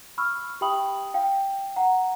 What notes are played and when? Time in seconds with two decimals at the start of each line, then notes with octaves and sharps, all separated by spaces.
0.18 B5 C#6 E6 F6
0.61 G4 E5 G5 B5 D#6 F#7
1.14 F5 G5
1.76 F#5 A#5